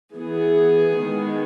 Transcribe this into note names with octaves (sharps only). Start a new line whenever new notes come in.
E3 B3 G#4
D#3 G#3 B3